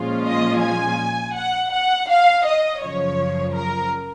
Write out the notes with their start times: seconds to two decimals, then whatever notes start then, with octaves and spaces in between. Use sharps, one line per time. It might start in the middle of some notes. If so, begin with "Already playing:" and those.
Already playing: A#2 F3 G#3 C#4 F4
0.27 D#5
0.63 G#5
1.36 F#5
1.72 F#5
2.09 F5
2.46 D#5
2.82 F#2 C#3 F3 C#5
3.55 A#4